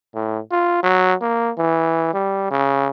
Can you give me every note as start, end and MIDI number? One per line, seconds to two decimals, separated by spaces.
0.14 0.39 45
0.51 0.79 65
0.83 1.14 54
1.22 1.51 58
1.58 2.11 52
2.14 2.48 55
2.51 2.89 49